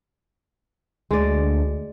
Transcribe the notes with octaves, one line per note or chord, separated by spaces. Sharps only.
D2 G#3 D5